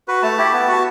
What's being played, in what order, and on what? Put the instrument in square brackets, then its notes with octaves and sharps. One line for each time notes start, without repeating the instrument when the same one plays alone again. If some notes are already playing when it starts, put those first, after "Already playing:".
[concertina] F#4 B4
A3 A5
E4 G4
B3
F#4 A5